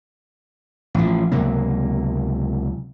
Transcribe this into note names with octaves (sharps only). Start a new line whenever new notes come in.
A1 F3
C#2 C3 F#3 A#3